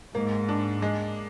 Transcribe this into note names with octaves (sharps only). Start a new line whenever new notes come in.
G#2 A#3
D4
G#3